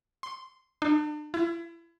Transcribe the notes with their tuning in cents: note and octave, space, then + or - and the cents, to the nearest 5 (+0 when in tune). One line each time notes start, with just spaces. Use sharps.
C6 -10
D4 +40
E4 +35